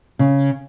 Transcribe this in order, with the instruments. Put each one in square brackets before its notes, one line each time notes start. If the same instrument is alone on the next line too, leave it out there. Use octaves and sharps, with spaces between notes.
[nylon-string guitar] C#3